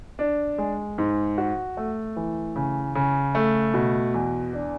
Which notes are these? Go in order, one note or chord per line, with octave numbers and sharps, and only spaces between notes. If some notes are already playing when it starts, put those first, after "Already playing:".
D4
G#3
G#2
F#4
A3
E3
C#3
C#3
A3
B2
E2
D4